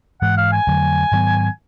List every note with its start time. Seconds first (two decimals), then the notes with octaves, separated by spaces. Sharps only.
0.21 G#2 E3 G#3 F#5
0.37 F5
0.52 G#5
0.67 F2 D3 F#3 A3
1.12 G#2 D#3 F#3 B3